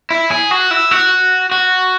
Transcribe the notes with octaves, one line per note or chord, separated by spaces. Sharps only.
E4
G#4
F#4
E4
F#4
F#4